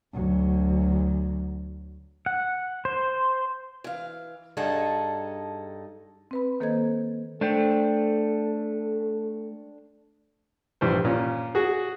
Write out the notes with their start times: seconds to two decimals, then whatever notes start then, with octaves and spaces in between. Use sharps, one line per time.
0.13 D2 F#3
2.26 F#5
2.85 C5
3.84 E3 F5
4.57 G2 D#4 G#4 A4 F#5 A5
6.31 C4 B4 B5
6.60 D#3 A#3 A4 C5 D#5 G#6
7.41 A3 D4 A4 C5 G5
10.81 A#1 G2 E3 C5
11.05 A#2 C#4
11.55 F#4 G#4